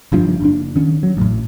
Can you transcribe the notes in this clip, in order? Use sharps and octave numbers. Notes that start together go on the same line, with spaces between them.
F#1 G2 F3 D4
F#1 D4
D#3 C#4
F#3
A1 A2